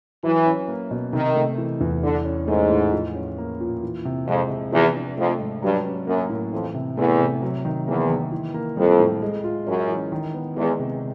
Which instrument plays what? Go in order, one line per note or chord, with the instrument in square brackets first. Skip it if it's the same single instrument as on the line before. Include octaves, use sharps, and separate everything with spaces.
[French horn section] E3 [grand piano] F#3
[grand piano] C#4
A#3
B2
[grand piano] C3 [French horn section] D#3
[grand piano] A3
E3
E2
[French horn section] D3 [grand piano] E3
[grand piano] C#4
[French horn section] G#2 [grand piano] A3
[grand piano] A2
F3
C#4
A#3
A#2
E3
C3
[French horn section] F2 [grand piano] G#3
[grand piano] C3
[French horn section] E2 [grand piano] F3
[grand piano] D4
[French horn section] F2 [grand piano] A3
[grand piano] G#2
[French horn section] G2 [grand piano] F#3
[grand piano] C#4
[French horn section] F#2 [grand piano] A#3
[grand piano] A2
[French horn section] F2 [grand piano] E3
[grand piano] C3
[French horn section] E2 [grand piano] A3
[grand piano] C3
F#3
D#3
[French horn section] E2 [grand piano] A#3
[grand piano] D#3
E3
A#3
[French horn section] F2 [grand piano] G3
[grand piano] A2
G#3
F4
[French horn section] F#2 [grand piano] C#4
[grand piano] E3
D#3
B3
[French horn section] E2 [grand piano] G#3
[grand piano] C3